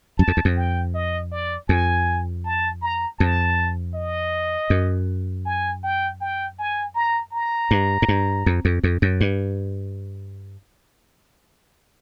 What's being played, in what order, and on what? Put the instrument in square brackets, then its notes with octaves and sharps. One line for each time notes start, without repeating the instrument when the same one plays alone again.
[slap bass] F#2 [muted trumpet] A5
[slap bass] F2
E2
F2
[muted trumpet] G5
D#5
D5
[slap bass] F2 [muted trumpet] G#5
[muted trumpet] A5
A#5
[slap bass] F2 [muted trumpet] A5
[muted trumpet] D#5
[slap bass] F#2
[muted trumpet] G#5
G5
G5
G#5
A#5
A#5
[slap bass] G2
G#2
G2
F2
F2
F2
F#2
G2